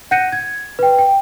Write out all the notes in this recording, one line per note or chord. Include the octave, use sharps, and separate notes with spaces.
F#5 F#6 G6 A#6 C#7 D#7
G#6
B4 G5
G5